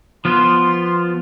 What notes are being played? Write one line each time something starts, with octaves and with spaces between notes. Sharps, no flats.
F3 B3 F4 C6